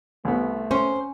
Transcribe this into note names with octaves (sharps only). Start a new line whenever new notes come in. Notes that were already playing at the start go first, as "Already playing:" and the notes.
C2 A3 B3
C#4 C5